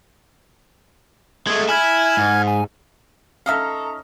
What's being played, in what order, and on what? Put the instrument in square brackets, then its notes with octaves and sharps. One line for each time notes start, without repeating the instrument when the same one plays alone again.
[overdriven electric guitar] G#3 A3 [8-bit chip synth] G#6
[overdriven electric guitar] E4 [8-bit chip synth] G#5 F6 G#6
[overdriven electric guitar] G#2
[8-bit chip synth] G#5
[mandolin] C#4 D#4 F6 [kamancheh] A4 A#5 [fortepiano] E5 F5